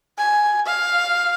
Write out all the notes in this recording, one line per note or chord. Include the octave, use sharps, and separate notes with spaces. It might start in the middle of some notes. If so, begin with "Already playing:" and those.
G#5
F5